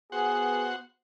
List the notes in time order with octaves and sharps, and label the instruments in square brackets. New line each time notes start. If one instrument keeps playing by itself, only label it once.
[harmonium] B3 [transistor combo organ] F#4 C5 F#5 [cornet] G#4